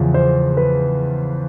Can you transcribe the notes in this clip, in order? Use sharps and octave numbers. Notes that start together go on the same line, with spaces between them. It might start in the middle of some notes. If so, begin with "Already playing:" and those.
Already playing: E2 C#3 F3
C5
B4